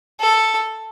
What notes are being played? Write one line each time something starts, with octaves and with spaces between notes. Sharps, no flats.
A4